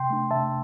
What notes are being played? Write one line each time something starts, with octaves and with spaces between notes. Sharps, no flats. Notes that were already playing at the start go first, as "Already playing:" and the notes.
Already playing: C3 G5 C6
A3 D4
C3 E5 A5